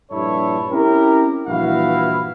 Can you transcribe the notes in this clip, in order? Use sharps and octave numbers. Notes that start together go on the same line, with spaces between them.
A#1 G2 D4 E4 A4 C#5
C4 C#4 E4 G4 A#4
A#1 G2 E3 E4 F#4 F5